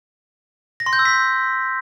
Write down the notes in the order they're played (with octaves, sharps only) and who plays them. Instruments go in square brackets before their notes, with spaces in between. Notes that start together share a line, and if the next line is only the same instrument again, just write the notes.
[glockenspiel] A#6
C6
G6
E6
B6